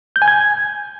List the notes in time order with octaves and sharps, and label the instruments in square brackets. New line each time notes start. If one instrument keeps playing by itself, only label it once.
[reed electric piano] G6
G#5
G#6